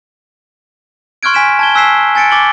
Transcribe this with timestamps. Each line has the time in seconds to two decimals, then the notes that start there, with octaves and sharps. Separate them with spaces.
1.23 C6 C#6 F6 F#6 G#6 D7
1.34 G#5 B6 D7 E7
1.59 A5 G#6 G7
1.75 G#5 E6 F#6 B6 C7 E7
2.15 G#5 A6 C#7 D7
2.31 D6 A6 F#7 G7